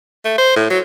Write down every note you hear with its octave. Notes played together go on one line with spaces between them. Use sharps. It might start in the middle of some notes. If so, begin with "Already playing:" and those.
A3
C5
A2
F#3